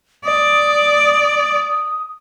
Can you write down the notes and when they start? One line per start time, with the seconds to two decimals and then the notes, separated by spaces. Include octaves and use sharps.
0.25 D5 D#6